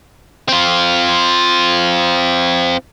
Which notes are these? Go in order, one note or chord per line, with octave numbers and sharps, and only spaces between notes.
C4 F4